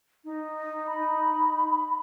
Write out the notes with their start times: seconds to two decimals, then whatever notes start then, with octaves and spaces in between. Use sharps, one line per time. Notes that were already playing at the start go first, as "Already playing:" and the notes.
0.24 D#4
0.87 B5